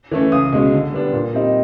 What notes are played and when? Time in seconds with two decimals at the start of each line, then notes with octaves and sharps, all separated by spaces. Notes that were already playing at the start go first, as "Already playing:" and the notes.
0.12 E3 A3 C#4
0.32 C#2 D#6
0.53 B2 G#3 C#4
0.73 D3
0.93 G3 B3 D4
1.13 A#2
1.33 G3 C4 D#4